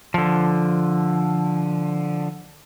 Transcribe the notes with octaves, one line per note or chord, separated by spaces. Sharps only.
D3 F3